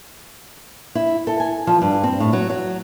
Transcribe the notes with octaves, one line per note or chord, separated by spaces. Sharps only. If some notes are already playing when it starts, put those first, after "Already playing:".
E4
A4
G#5
F3
G2
C4
A2
F#3
F#3